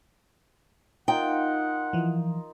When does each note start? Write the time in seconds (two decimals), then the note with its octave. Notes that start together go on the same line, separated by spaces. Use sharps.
1.08 D#4 F4 A#4 F#5 G5
1.93 E3 F3